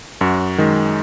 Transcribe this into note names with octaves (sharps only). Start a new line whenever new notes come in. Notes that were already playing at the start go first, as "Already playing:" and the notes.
F#2 F#4
D#3 G#3